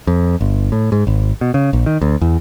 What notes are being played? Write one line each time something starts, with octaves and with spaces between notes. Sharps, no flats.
F2
G1
A2
G#2
G#1
B2
C#3
A#1
D#3
D2
E2